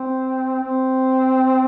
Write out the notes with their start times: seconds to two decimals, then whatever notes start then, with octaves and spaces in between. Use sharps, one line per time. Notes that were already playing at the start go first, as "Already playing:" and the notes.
Already playing: C4
0.63 C4